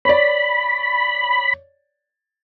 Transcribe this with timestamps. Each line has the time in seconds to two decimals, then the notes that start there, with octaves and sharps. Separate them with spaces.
0.05 C#5 D5 B5